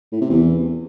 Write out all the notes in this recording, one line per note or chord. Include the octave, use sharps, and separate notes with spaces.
A2
C3
E2